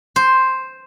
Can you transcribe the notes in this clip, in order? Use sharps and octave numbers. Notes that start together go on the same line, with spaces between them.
C5